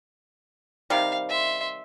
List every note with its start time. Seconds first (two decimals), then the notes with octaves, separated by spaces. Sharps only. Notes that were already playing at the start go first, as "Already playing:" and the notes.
0.90 C3 D#3 G3 F5
1.29 E5 C6